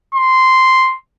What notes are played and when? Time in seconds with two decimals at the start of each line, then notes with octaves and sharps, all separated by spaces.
0.15 C6